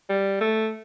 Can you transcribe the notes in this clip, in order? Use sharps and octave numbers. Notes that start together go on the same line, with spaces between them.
G3
A3